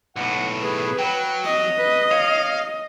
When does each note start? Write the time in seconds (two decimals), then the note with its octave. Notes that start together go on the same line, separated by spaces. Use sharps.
0.16 B1 A2 F#5
0.62 G#4 B4
0.99 F#3 G5
1.46 D#5
1.78 B4
2.12 C#5 F5